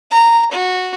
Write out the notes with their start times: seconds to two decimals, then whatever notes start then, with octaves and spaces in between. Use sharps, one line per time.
0.11 A#5
0.51 F#4